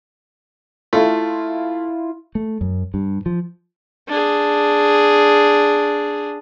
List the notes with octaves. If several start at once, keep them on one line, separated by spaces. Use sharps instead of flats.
A3 E4 F4
A3
F#2
G2
F3
D4 G#4